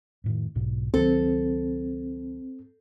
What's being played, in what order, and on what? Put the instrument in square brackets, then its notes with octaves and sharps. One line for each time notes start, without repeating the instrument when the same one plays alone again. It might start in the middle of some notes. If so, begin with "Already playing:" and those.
[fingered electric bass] F2 A2 D#3
B1 G#2 B2
[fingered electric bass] C#2 D#3 F#3 [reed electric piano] C4 [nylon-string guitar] A4